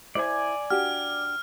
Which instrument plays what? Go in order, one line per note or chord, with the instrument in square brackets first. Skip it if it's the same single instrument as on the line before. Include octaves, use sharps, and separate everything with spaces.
[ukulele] E4 C5 B5 [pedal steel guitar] D5 G#5
[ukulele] D4 F#4 G4 [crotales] F6